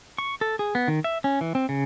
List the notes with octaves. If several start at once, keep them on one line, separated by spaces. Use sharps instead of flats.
C#6
A4
G#4
B3
D#3
E5
C#4
E3
C4
C#3